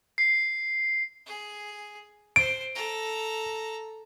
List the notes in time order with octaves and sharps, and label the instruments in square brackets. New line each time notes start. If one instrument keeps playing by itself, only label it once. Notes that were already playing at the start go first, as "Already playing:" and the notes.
[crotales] C7
[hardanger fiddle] G#4
[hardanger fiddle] C5 [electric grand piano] D7
[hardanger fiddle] A4 A#5